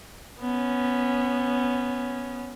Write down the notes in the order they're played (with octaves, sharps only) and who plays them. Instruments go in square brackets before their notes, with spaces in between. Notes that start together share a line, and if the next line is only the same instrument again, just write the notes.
[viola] B3 C#4